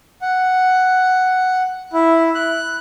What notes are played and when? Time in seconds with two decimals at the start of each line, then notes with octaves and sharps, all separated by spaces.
0.22 F#5
1.93 E4
2.35 F#6